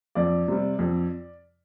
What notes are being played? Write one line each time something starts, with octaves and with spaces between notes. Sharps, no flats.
F2 D5
C3 G3
F2